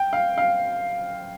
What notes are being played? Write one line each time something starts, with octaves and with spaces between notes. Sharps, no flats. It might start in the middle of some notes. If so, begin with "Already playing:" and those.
Already playing: G5
F5
F5